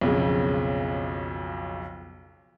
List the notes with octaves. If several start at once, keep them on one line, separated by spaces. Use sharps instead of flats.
B1 F2 C#3